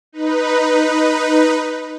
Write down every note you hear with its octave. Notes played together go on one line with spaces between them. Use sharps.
D#4 B4